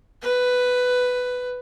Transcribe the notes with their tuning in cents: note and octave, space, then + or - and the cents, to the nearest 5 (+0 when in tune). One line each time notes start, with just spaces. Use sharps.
B4 +10